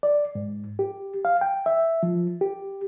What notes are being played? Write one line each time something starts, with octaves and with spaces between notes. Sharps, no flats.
D5
G#2
G4
F5
G5
E5
F3
G4